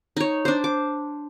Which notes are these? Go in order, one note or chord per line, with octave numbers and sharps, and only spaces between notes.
D#4 C#5
D4 C5
D6